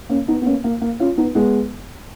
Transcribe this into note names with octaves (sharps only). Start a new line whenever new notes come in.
A#3 C#4
B3 D#4
B3
A#3 C#4
A#3
A#3
C#4 F4
B3 D#4
G#3 B3